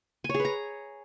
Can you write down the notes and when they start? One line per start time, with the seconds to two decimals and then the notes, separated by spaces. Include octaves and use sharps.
0.24 G#5
0.29 C#5
0.35 G#4
0.40 B4
0.45 A#5